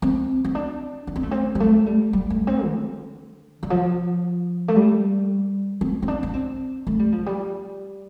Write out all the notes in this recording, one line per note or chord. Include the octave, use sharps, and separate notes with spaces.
C4
C4
D4
D4
C4
A3
C4
G3
A3
G3
G3
A3
C4
D3
D3
F3
A3
G3
C4
C4
D4
D4
C4
A3
G3
F3
G3